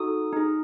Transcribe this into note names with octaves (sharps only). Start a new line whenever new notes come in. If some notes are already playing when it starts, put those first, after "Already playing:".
Already playing: D#4 F#4 A4 D#6
D#4 G#4